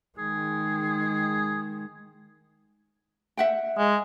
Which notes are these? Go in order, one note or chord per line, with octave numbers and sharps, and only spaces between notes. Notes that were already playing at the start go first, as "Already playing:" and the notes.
D#3 G#3 G#4
E5 F#5 G5
G#3